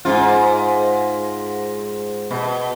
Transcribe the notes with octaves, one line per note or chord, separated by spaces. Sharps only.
G#2 F4
B2